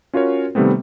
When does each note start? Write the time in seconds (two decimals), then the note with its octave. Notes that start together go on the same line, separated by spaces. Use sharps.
0.13 C#4 F4 F#4 A#4 C#5
0.55 C3 D#3 G3 A3 B3 C4